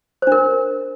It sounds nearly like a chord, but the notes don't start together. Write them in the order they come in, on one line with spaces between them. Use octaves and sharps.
C5 D4 A#4